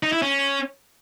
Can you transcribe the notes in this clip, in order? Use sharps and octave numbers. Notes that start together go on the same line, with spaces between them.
D#4
E4
C#4